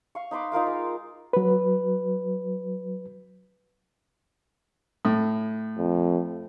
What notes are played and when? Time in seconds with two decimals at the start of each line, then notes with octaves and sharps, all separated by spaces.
0.15 F5 C#6
0.31 D#4 B4 C6 D6
0.52 D#4 F4 A#4 F5
0.67 G#3
1.33 F#3 B4
5.05 A2
5.78 F2